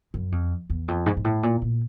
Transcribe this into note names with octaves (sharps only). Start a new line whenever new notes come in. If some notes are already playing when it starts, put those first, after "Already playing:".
F#2
F2
E2
F2
G#2
G#2
A2
A#2
A#2